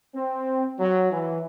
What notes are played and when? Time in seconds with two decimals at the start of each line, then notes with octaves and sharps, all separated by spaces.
0.14 C4
0.78 F#3
1.11 E3